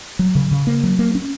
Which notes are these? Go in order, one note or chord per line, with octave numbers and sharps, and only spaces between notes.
F#3
C#3
C#3
A#3
F#3
A#3
C#4